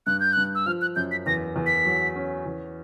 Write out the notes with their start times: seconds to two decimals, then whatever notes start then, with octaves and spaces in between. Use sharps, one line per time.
0.07 G2 F#6
0.20 G6
0.33 G2 F#6
0.55 E6
0.66 F3 F6
0.82 F#6
0.96 F#2 G6
1.11 B6
1.26 E2 A#6
1.56 E2
1.66 B6
1.85 F#3
2.16 C#4
2.46 E2